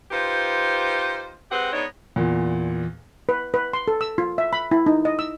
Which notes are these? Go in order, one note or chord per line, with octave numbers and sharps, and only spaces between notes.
D#4 F4 G4 B4 C5
G#3 C4 G4 B4 F#5
G#3 B3 D4 D#4 C#5
E2 A#2
B4
B4
C6
A4
E6
F4
E5
B5
E4
D#4
D#5
E6